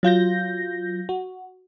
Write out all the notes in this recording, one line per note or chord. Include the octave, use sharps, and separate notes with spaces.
F#3 F4 G6 A#6
F#4